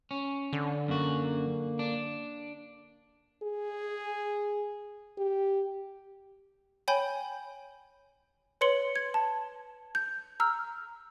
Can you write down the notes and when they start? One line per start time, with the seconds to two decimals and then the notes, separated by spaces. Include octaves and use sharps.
0.11 C#4
0.53 D3
0.88 F#2 A#3 F#4
1.79 D4
3.43 G#4
5.18 G4
6.88 C#5 G5 G#5 B5 G6 G7
8.61 B4 C#5 C6 C#7 F#7 G7
8.96 G#6
9.14 A5
9.95 G6
10.40 A#5 E6 F6